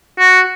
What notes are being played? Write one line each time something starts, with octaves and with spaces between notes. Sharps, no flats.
F#4